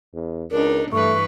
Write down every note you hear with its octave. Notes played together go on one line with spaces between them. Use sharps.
E2
C#2 D4 D#4 A#4
G2 E3 A3 B4 C#6